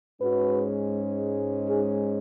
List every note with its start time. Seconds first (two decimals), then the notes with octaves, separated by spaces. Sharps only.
0.21 G#2 G#3 C#4 F#4 B4
1.69 D#4 G#4